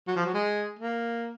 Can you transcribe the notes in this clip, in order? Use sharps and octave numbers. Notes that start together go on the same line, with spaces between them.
F#3
F3
F#3
G#3
A#3